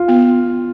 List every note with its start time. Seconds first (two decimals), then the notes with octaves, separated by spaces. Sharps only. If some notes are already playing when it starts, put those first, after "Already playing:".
Already playing: F4
0.08 B3